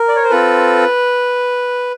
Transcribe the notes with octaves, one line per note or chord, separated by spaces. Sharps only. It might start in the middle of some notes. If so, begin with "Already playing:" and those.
Already playing: A#4
D5
C#5
C5
C4 F4 A4 B4